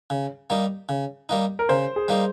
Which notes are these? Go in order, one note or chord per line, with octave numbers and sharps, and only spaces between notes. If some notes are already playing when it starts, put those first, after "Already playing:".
C#3
G3 A#3 D#4
C#3
G3 A#3 D#4
A#4
C#3 C5
G#4
G3 A#3 D#4